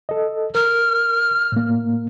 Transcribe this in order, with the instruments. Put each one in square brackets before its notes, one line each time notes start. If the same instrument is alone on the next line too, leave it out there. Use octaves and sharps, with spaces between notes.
[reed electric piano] A4 D#5
[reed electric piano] A#4 [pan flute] F6
[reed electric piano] A2 A#3